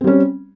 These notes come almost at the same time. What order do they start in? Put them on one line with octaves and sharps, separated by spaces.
C4 G3 C#4